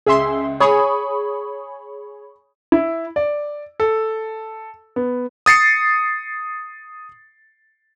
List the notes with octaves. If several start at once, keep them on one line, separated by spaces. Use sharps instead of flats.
C#2 G#4 E5 C6
G#4 C#5 B5 C#6 D#6
E4
D5
A4
B3
D#6 A6 C7 C#7